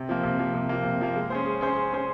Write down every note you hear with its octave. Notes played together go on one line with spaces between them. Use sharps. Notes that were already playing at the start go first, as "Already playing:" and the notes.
Already playing: C3
F3 A#3
C3
F3 A#3
C3
F3 A#3
C3
F3 A#3
G#3
C#4 G#4 C5
G#3
C#4 G#4 C5
G#3
C#4 G#4 C5